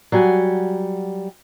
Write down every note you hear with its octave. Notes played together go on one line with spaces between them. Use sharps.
F#3 G3 F#5 G#5